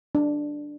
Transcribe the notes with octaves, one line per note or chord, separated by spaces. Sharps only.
D4